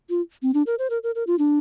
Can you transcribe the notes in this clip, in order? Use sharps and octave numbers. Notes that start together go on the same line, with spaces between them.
F4
C4
D4
A#4
C5
A#4
A#4
A#4
F4
D4